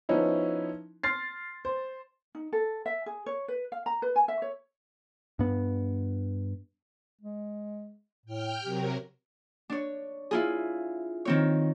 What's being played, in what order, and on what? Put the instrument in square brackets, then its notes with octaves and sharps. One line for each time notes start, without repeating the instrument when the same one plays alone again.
[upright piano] F3 B3 C#4 D#4 E4
C6 F6 A6 C7
C5
[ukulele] D#4
A4
E5
G#4
C#5
B4
F5
A#5
B4
G#5
E5
C#5
[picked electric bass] G2 B3
[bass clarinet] G#3
[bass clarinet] A2 [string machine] G5 F6 G6
[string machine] C3 F#3 A#4 [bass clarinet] G4
[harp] D4 C#5
E4 F4 G#4
D#3 C4 C#5